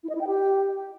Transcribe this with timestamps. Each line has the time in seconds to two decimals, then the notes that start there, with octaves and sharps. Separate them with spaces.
0.04 E4
0.09 D#5
0.15 E4
0.21 G5
0.27 G4